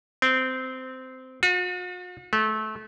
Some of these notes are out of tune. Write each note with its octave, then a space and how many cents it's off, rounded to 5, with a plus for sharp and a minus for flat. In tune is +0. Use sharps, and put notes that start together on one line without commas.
C4 -15
F#4 -45
A3 -25